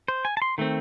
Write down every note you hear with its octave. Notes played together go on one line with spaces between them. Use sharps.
C5
G#5
A5
C6
D#3 A3 C4